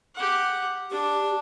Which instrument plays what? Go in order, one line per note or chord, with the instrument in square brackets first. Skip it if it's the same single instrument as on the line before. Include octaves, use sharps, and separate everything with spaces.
[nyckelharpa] G4 F#5
[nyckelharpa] D4 [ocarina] G4